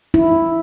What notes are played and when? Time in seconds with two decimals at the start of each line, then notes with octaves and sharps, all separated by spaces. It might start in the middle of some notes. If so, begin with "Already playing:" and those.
0.14 E4